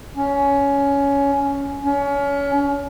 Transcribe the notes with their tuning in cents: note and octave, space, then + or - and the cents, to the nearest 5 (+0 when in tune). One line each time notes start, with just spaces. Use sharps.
C#4 +15
C#4 +30